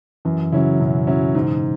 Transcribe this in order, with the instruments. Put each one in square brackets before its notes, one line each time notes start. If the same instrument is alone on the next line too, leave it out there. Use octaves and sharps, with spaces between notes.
[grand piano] F#2 [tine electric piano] E3
[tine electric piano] C#3 [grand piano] F#3 C#4 E4
[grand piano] F#2 [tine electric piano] B2
[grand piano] F#3 C#4 E4
G#2